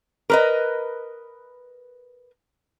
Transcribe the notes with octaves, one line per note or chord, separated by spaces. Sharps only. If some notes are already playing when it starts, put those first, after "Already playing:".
A#4 B4 D#5